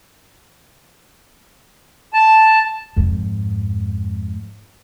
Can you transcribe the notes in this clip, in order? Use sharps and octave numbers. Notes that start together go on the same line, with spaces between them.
A5
F2 G#2